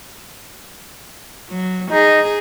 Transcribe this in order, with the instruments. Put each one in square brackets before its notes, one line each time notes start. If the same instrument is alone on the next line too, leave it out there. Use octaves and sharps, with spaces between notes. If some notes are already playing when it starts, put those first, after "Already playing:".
[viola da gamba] F#3
[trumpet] D#4 [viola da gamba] G#4